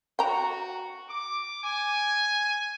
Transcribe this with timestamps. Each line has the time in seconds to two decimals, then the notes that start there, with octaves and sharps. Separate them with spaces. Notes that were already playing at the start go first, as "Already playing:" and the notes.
0.19 F#4 G5 A#5
1.09 D6
1.63 G#5